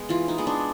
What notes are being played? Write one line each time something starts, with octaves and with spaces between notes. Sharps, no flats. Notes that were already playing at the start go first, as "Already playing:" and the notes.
Already playing: G#3 B3
E3 F4
D#4
G#3 B3
D4